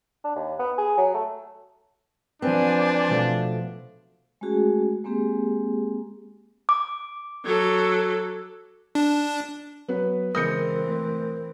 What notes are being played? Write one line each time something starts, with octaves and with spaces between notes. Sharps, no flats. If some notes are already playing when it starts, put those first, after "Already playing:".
D4
D#2
B3
G#4
F#3
A3
F3 C4 D4 B4 C5 D5 G#5
B2 F3 A3
G#3 A3 C#4 F#4 G#4
G#3 A#3 C4 G4 G#4
D6
F#3 A4
D4
F#3 B3 B4
C#3 E3 G#3 C4 A#4 D#6 G6 C#7
A3 C5